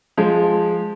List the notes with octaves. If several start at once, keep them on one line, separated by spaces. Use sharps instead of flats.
F3 G#3